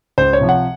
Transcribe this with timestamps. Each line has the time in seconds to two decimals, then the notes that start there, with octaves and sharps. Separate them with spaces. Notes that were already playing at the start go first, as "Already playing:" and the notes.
0.18 C#2 C5
0.33 C#5
0.41 C3 F3
0.49 F#5